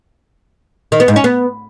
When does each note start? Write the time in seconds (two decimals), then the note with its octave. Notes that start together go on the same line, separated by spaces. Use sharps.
0.92 D#3
1.00 B3
1.08 G#2
1.16 C#4
1.24 B3